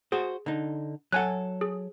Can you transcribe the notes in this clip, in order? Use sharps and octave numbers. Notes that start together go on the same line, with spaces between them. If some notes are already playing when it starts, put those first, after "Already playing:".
F#4 G#4 C5
D3 D#4
F#3 A4 F#5 G#5 F#6
G#4